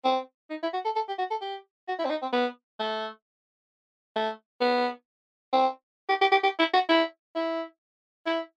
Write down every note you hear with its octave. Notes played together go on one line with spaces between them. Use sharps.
C4
D#4
E4
F#4
A4
A4
G4
F#4
A4
G4
F#4
E4
C4
D#4
C4
B3
A3
A3
B3
C4
G4
G4
G4
G4
E4
F#4
E4
E4
E4